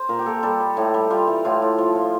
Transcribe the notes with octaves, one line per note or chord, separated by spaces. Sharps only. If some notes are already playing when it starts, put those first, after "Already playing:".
Already playing: C5
A#2 A#4
G4
A#2 A4
G3 A4
G3
A2
G3
G3 F4
E3
A2 F4
A2
F3
F3